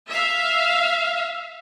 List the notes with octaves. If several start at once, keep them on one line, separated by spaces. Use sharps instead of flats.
E5 F5